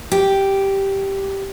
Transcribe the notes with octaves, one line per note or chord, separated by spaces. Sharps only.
G4